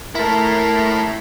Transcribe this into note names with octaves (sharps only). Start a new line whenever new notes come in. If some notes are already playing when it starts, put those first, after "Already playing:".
A3 E4 A#4